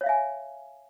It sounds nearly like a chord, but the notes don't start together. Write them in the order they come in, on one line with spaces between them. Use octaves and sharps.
C#5 F5 E5 G#5